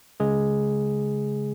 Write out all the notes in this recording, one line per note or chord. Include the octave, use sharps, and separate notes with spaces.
C#3 G#3 G#4